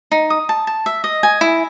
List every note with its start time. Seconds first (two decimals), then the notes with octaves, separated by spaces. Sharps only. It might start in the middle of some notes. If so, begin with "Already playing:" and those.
0.12 D#4
0.30 D#6
0.49 A5
0.67 A5
0.86 E5
1.04 D#5
1.23 G#5
1.41 E4